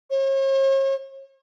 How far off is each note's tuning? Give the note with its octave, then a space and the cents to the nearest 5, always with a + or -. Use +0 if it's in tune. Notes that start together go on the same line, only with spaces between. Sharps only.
C#5 -45